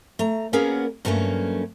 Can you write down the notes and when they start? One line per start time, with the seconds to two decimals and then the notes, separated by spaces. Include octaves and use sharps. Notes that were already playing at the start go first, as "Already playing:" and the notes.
0.19 A3 A#5
0.53 A#3 B3 C#4 F#4 G#4 A#4
1.05 G2 F#3 A3 A#3 C#4